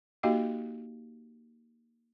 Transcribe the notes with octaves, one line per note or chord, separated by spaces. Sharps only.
A#3 D#4 F#4 G4 D#5 F5